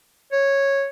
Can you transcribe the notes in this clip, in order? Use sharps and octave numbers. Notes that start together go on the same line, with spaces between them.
C#5